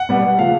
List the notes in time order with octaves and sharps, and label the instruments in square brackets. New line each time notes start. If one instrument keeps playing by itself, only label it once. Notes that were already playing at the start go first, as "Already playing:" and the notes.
Already playing: [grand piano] F#5
B2 G3 B3
C#3 F3 A3 F5